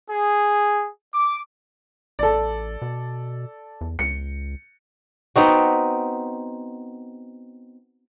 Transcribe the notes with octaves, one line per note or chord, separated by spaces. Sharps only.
G#4
D6
A1 A4 D5
B2
E2
C#2 C#7
B3 C4 D#4 F#4